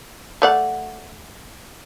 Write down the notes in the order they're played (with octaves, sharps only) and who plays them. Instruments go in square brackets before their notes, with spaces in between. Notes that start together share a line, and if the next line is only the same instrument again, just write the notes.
[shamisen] A3 D5 F#5